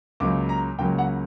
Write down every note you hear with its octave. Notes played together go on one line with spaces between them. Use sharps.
C#2 C#3 F#3 A#3 D6
A#5
C#2 C#3 F#3 A#3 G5
F#5